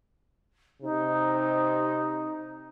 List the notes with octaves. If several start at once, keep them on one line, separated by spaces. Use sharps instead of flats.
C3 D#4